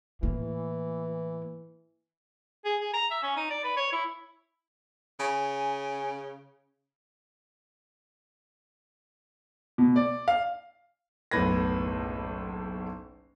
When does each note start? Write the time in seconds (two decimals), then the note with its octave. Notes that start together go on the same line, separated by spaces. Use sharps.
0.23 A2 E3 A#3
2.65 G#4
2.80 G#4
2.93 A#5
3.11 E5
3.22 C#4
3.36 D#4
3.50 D5
3.64 B4
3.76 C#5
3.92 E4
5.20 C#3 G#5
9.78 B2
9.96 D5
10.28 F5
11.31 F#1 B1 A2 B4 G#6 A#6